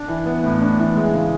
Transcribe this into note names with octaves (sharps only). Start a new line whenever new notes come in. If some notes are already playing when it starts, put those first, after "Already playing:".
Already playing: D4
E3
B3
A2
D4
E3
G#3
C#3